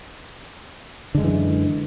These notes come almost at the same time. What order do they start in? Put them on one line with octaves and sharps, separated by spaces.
D3 G#3 F#2 E3